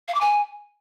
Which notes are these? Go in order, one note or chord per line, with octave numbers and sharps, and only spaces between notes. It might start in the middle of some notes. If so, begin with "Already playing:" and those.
F5
D6
G#5